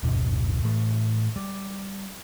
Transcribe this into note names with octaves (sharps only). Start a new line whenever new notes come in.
D1 G1 F#2 B2
A2 E3 A3
G3